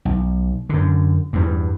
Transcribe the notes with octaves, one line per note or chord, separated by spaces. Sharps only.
B1
F#2 D3
E2 G2